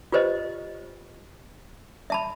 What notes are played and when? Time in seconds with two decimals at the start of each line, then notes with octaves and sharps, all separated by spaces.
0.12 F4 G4 B4 C5 D#5
2.10 E5 A5 B5